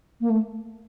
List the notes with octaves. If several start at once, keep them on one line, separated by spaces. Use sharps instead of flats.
A#3
A3